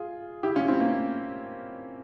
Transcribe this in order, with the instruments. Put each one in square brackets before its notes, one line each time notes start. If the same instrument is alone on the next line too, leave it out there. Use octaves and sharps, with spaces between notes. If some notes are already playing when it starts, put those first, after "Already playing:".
Already playing: [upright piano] F4 G#4
E4 G4
C#4 F4
C4 E4
A#3 C#4